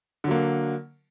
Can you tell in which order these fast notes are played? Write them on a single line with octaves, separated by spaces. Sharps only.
D3 F#3 A#3